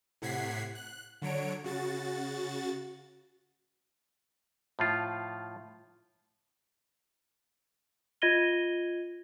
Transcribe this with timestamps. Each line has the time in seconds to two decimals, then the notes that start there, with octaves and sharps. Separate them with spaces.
0.22 A2 C3 F#5 G#6 B6 C7
0.75 F#6
1.22 D3 F#3 C#5 D7
1.64 C#3 F#4 A6
4.79 A2 F3 F4
8.22 F4 D#5 G#6 A#6 D#7 G7